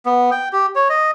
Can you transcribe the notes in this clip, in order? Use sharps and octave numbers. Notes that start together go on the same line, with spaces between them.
B3
G5
G4
C#5
D#5